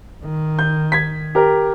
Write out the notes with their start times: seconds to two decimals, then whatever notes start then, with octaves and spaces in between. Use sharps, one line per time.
0.24 D#3
0.59 G6
0.92 G#6 B6
1.35 G4 A#4